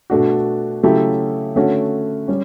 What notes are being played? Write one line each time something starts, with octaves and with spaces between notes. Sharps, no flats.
B2 A3 D4 F#4
C#3 F#3 A3 E4 G4
D3 A3 C#4 F#4
G3 C#4